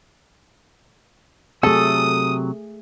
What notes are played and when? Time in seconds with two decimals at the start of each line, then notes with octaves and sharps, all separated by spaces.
1.63 C3 F#3 A3 G#4 A4 D#6